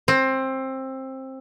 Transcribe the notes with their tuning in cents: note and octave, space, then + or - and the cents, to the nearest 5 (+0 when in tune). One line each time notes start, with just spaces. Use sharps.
C4 +20